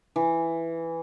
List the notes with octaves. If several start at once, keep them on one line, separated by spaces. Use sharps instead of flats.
E3